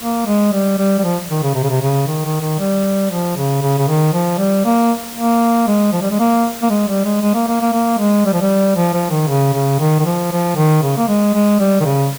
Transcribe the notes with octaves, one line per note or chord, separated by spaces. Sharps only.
A#3
G#3
G3
G3
G3
F3
D#3
C#3
C3
C#3
C3
C#3
D#3
D#3
D#3
G3
F3
C#3
C#3
C#3
D#3
F3
G3
A#3
A#3
G#3
F3
G3
G#3
A#3
A#3
G#3
G3
G#3
G#3
A#3
A#3
A#3
A#3
G#3
G3
F3
G3
F3
F3
D#3
C#3
C#3
D#3
D#3
F3
F3
D#3
C#3
A#3
G#3
G#3
G3
D#3
C#3